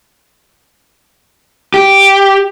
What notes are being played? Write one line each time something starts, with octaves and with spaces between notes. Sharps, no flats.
G4